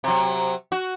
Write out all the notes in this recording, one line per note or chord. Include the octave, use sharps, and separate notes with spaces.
C3 F#3
F#4